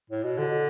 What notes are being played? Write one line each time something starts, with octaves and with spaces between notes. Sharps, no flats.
A2
B2
D3